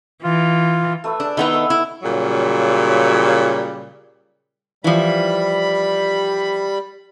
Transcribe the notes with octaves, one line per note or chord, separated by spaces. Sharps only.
E3 F4
A3 B4 E5
D4 G#4
D#3 B3 D#4 E4 F#5 E6
A3 B4 E6
E4
A#2 C#3 F#3 G3
E3 F3 G3 B5